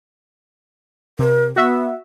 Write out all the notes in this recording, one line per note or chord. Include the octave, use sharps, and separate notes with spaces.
C3 A#4
B3 F#4 E5